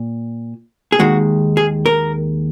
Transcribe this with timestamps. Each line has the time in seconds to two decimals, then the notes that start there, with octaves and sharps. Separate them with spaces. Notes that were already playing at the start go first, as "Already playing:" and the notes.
Already playing: A#2
0.92 G#4
1.00 D#2 D#3 G#3 F#4
1.57 G#4
1.86 A#4